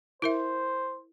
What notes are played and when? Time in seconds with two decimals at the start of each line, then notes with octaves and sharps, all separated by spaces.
0.22 E4 A#4 C5 E5